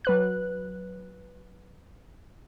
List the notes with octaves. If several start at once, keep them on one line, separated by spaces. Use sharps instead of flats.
F#3 B4 F#6